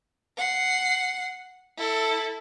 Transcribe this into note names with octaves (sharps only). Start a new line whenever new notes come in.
F#5 C7
E4 A4